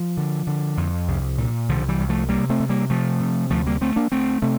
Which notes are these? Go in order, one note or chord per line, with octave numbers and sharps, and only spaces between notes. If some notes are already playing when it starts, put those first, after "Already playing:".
Already playing: F3
D3
D3
F2
C2
A#2
C2 D3 F3
E3 G3
C2
F3 A3
C3 G3 A#3
A3 C4
C3
G3 A#3
C3 F3 A3
C3
D2 F3 A3
G3 A#3
D2 A3 C4
A#3 D4
D2 A3 C4
C3 A3 C4